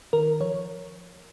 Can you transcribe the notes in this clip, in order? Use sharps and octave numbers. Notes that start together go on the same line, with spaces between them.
D#3 A#4
F3 C#5